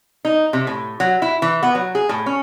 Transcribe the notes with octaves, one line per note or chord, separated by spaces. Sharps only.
D#4
C3
A2
F#3
E4
E3
B3
F#3
G#4
A2
C#4